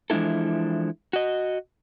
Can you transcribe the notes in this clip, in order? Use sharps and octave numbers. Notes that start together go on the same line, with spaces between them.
E3 F3 G#3 D4 E4 A4
F#4 D#5